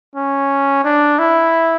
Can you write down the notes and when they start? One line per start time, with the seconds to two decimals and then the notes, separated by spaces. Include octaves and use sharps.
0.15 C#4
0.84 D4
1.19 E4